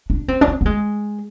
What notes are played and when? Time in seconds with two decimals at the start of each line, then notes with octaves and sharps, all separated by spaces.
0.10 D4
0.28 C4
0.41 D4
0.47 C4
0.61 B3
0.66 G#3